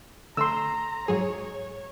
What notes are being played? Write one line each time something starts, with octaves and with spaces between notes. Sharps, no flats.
D3 A3 A#5 C6 E6
G#2 F#3 G#4 C#5
C#5